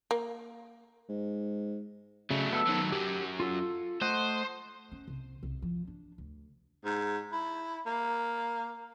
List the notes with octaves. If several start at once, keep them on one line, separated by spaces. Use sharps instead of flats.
A#3
G#2
C#3 F#3 A3
B3 A4 E6
D#3 F#3
F#2 F#3 G4
F4 A4
A3 C5 D#5 F#5
C#4
C2
C2
F3
D4
D2
G#2
E4
A#3